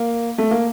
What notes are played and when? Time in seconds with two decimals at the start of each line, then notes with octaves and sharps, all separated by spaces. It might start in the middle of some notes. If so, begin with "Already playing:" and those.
Already playing: A#3
0.38 A3
0.51 A#3